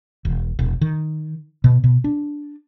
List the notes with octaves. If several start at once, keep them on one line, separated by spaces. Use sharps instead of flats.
E1
E1
D#3
B2
B2
D4